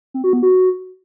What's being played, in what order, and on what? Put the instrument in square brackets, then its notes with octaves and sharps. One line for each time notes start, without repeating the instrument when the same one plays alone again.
[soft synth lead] C4
F#4
B3
F#4